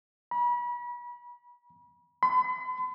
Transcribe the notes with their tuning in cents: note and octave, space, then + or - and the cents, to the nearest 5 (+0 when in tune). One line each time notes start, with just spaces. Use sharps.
B5 -35
B5 +45